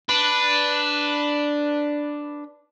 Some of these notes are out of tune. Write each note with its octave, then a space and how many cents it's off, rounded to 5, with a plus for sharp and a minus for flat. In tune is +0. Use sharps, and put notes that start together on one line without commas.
D4 +0 B4 +0